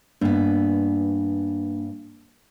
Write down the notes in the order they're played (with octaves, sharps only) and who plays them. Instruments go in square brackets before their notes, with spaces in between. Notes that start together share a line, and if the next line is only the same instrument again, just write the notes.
[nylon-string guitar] G2 B3 [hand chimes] A#3 D4